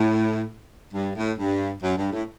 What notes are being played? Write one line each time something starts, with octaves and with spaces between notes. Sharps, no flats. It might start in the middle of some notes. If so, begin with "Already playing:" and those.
Already playing: A2
G2
A2
G2
F#2
G2
A2